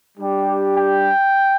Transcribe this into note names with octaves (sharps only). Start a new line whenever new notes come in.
G3 D4 G4
G5